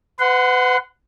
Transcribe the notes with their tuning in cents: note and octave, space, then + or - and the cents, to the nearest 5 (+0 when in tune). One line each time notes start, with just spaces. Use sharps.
B4 +35 F#5 +0 C6 -25